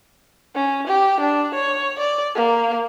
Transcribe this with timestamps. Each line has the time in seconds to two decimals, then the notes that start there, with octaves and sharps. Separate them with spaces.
0.55 C#4
0.87 G4
1.20 D4
1.54 C#5
1.99 D5
2.35 A#3